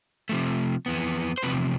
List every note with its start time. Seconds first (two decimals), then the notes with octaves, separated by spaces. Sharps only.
0.29 C3 F3 A3
0.86 F2 E3 B3
1.38 C5
1.42 E2 C3 F3 C4 B4